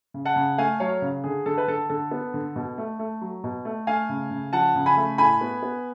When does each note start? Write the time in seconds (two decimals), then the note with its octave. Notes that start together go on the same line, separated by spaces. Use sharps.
0.14 C#3
0.25 F#5 A5
0.36 C#3
0.58 A3 F5 G#5
0.80 F#3 C#5 F5
1.02 C#3
1.24 D3 G#4
1.46 D3 A4
1.58 B4
1.68 D3 A4
1.90 D3 A4
2.11 B3
2.34 D3
2.56 B2
2.78 A3
2.99 A3
3.21 F#3
3.44 B2
3.65 A3
3.87 A3 F5 G#5
4.09 C#3
4.31 C#3
4.53 F3 F#5 A5
4.76 C#3
4.86 G#5 B5
4.97 A3
5.18 A2 G#5 B5
5.41 B3
5.63 B3